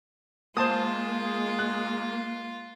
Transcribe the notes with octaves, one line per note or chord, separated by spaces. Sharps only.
G#3 A#3 F4 C5 A5 D#6
F#6